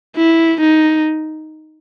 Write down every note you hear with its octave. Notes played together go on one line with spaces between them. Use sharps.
E4
D#4